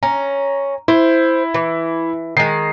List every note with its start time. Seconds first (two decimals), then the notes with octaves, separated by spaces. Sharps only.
0.03 C#4 A#5
0.88 E4 C5
1.54 E3
2.37 D#3 G#3 C7